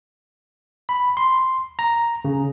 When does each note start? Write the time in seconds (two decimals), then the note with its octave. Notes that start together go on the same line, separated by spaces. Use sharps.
0.89 B5
1.17 C6
1.79 A#5
2.25 C#3